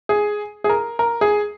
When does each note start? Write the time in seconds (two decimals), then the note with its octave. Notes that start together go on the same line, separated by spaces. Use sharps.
0.09 G#4
0.64 G#4
0.69 A#4
0.99 A#4
1.21 G#4